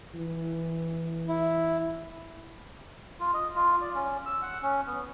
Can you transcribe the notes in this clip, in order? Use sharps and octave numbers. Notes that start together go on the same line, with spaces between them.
E3
E4
F4
D#5
F4
D5
C#4
E6
F#5
C#4
B3